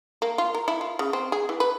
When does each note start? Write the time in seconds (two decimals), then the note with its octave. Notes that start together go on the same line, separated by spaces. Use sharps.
0.22 A#3
0.38 F4
0.54 A#4
0.68 E4
0.81 F4
0.99 C#3
1.13 C4
1.32 G#4
1.49 E3
1.60 B4